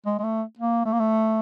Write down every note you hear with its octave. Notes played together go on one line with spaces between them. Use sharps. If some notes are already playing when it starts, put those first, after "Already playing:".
G#3
G#3
A3
A#3
A3
A#3
A3